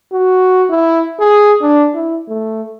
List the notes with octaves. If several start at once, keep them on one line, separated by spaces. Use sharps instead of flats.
F#4
E4
G#4
D4
E4
A3